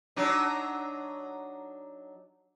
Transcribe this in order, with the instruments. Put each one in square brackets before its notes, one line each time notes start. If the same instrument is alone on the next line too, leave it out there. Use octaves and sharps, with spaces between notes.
[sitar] F#3 D4 D#4